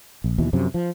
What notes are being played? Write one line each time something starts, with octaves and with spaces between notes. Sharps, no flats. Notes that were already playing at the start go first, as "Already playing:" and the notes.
A#1
D#2 B2 E3
F#2 C3 F3
F3